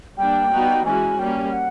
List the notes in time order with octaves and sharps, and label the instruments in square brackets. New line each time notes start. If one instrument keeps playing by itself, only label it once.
[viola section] G3 A#3 D4 [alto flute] G5
[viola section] G3 B3 D#4 F#4
[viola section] E3 G#3 C#4 F#4 [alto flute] G#5
[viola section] G3 A#3 C#4 [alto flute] G5
[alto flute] F#5